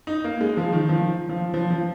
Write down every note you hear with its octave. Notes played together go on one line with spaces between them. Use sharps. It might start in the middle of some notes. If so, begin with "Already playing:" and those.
D#4
A#3
G#3
F3
D#3
F3
F3
F3
F3